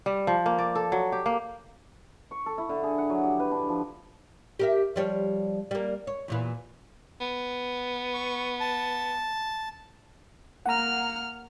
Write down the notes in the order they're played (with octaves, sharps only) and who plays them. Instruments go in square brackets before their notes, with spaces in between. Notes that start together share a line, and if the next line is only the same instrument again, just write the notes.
[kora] G3
F3
A#3
D5
A4
F#3
G4
A#3
[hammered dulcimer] C#6
A4
E4
D3
G#4
F#5
F#3
G4
B4
D4
F3
[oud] G4 A#4 E5
F3 G3 C#5
G3 A#3
C#5
E2 A#2 E3
[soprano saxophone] B3
[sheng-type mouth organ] C#6
A5
[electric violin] A#3 F6 [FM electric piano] F#5 A#5